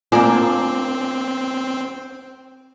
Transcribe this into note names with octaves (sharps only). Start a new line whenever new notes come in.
A#3 C4 D4 F4 A4 G#5